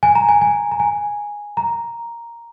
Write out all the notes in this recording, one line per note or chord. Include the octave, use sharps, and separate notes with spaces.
G#5
A#5
G#5
G#5
A#5
G#5
A#5